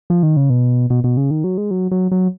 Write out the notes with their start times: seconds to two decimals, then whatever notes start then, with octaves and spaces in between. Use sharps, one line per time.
0.10 F3
0.23 D#3
0.37 C#3
0.50 B2
0.90 B2
1.04 B2
1.17 C#3
1.31 D#3
1.44 F#3
1.58 G#3
1.71 F#3
1.91 F#3
2.12 F#3